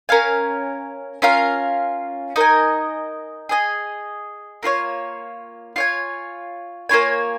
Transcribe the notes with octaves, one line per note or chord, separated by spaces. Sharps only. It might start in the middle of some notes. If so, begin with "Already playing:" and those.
C#4 A#4 F5 G#5
C#4 F4 A#4 F5
D#4 A#4 D#5 G#5
G#4 D#5 G#5
A#3 F4 A#4 C#5
F4 C#5 G#5
A#3 F4 C#5 G#5